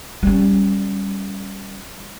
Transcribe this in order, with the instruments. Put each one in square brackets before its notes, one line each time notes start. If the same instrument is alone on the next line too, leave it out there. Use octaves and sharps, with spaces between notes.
[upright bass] G3 C#4